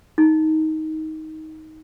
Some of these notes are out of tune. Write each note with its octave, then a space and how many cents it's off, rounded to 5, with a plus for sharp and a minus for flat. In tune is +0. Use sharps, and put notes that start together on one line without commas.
D#4 +15